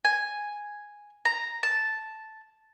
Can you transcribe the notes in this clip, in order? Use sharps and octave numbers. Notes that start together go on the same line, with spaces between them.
G#5
A#5
A5